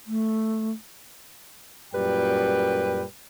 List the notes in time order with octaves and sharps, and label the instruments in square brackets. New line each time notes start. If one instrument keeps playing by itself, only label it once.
[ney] A3
[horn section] F#2 A#2 G3 B4 G5